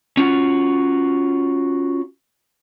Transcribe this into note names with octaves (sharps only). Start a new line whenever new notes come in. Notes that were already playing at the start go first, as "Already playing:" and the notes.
C#4 F4 F#4